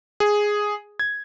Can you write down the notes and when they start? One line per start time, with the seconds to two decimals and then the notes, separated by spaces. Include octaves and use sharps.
0.20 G#4
0.99 G#6